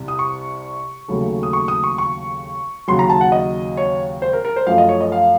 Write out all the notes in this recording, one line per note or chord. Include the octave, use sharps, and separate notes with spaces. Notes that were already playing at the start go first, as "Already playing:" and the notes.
Already playing: C2 C3
D#6
C#6
D#2 C#3 F#3 A3
D#6
C#6
D#6
C#6
C#6
D#2 C#3 F#3 C6
A#5
A5
F#5
D#5
C#5
C5
A#4
A#4
C5
F#2 F3 A3 F5
D#5
C#5
D#5
F5